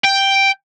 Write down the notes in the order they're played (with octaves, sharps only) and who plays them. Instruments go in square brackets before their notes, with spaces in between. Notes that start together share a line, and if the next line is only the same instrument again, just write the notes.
[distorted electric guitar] G5